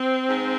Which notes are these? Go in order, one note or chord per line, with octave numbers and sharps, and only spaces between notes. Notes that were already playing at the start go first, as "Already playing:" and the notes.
Already playing: C4
G#2